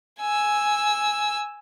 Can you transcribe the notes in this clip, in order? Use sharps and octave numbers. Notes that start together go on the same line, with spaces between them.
G#5 E6